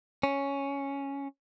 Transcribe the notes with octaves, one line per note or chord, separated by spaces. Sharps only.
C#4